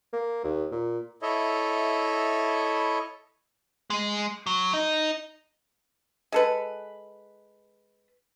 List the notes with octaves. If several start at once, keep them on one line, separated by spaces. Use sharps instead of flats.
A#3
D#2
A#2
E4 A4 C#5 D#5 E5
G#3
F#3
D#4
G#3 A4 B4